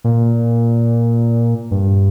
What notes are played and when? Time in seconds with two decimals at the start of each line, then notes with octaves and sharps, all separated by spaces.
0.04 A#2
1.71 G2